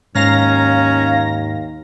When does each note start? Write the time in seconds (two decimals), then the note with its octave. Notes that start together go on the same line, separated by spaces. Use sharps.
0.15 D#2 G#2 C#4 F5 A#5 A#6